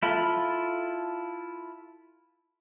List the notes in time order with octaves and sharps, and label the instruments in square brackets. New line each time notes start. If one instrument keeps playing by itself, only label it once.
[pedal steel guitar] E4 F4 A4 B5